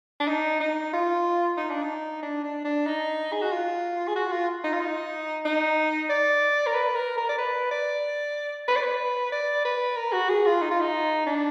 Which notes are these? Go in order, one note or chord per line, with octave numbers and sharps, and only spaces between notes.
D4
D#4
D#4
F4
D#4
D4
D#4
D4
D4
D4
D#4
G#4
F#4
F4
G#4
F#4
F4
D#4
F4
D#4
D#4
D5
A#4
B4
A#4
A#4
D5
B4
D5
B4
D5
B4
D5
B4
A#4
F#4
G#4
F4
D#4
F4
D#4
D4